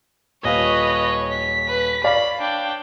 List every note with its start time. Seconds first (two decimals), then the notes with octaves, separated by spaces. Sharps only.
0.44 D#1 B4 C#5 D#5 F5
1.31 B6
1.69 B4
2.04 C#5 D5 F5 B5
2.41 D4 G5